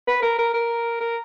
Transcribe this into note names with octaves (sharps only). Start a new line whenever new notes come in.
B4
A#4
A#4
A#4
A#4